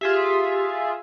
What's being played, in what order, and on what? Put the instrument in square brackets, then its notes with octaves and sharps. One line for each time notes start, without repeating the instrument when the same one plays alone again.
[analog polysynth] F4 G#4 E5 [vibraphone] G4